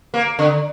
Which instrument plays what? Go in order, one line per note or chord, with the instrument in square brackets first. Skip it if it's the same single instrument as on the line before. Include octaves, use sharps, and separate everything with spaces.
[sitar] A#3
D3